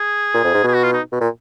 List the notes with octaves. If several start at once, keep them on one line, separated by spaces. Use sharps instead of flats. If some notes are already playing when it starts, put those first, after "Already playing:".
Already playing: G#4
A#2
F2
G#2
B2 G#4
F#4
F4
D#4
B2
A#2